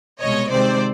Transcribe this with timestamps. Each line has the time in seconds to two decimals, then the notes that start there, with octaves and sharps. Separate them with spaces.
0.21 C2 B2 G#3 C#5 D#5
0.51 C3 D#3 G#3 C4 C5 D5